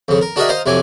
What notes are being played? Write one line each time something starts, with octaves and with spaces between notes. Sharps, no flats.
F2 C#3
A#4
D4 F#4 G#4 A#4 D#5 E5
C5 D#5 F5 A#5
F2 C3 F#3 G#5 D6